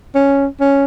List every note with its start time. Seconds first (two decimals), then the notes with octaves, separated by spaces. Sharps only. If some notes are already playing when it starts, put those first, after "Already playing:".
0.15 C#4
0.60 C#4